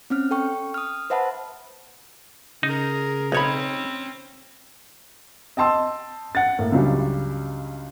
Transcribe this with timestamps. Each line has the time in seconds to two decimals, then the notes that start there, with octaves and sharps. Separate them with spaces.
0.10 C4 C#4 F6
0.31 A4 G5 C#6
0.74 D#6 F6
1.10 B4 C5 E5 F#5 A5 B5
2.63 C#3 D#4 G#4 A#4
3.32 B1 C4 C#4 D#4 C#5 B5
5.57 D#5 G5 A5 C6 E6
6.35 F#5 A6
6.59 A2 A#3
6.72 C#2 G2 C#3 F#3 G3